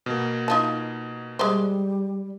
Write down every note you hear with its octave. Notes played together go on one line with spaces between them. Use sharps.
B2 A#3
D#4 F4 A5
G3 G#3 G4 C5